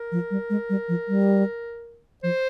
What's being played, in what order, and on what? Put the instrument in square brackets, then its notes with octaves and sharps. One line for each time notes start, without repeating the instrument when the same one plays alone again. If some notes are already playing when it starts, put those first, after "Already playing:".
Already playing: [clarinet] A#4
[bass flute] F3
G3
G#3
G3
F3
G3
[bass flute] F3 [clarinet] C5